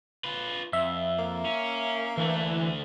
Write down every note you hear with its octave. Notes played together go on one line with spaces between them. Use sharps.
F4 B4
F2 E5
A#3
C#4
D2 E3 A3